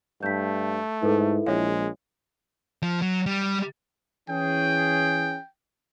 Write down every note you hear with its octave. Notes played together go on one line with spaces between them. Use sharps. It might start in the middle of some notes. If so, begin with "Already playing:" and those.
G2 A3 G6 B6
G#2 E4 A4 B4
A#1 G#3 C#5 F5
F3
F#3
G3
E3 C#4 G#4 G5